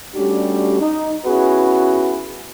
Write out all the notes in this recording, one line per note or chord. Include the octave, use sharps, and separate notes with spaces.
G3 A3 C#4 D4 F#4 G4
D#4
B3 C#4 E4 F#4 G#4 B4